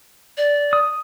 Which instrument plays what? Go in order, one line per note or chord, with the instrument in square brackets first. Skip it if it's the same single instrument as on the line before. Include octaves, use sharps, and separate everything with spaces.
[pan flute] D5
[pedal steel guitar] D#6